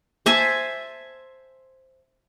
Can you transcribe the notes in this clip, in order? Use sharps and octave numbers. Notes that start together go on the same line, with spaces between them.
C5 E5 G#5 A5